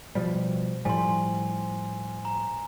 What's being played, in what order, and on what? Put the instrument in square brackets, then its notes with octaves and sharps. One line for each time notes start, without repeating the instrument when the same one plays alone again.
[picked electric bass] B2 F3 G3
[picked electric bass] A2 F3 G3 [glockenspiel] G#5 C6
[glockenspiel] A#5